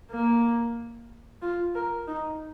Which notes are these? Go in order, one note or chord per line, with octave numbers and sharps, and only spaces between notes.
A#3
F4
A#4
D#4